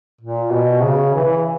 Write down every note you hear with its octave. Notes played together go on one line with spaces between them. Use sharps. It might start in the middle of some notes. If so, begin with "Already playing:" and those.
A#2
B2
C#3
E3